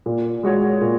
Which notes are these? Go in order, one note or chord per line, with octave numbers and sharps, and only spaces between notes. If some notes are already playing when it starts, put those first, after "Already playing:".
A#2
G#3 F#4 C#5
A#2